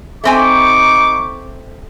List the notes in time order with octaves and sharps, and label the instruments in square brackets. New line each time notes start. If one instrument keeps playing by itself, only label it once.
[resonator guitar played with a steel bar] A3 C4 G#5 [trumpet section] D#4 C#6 D6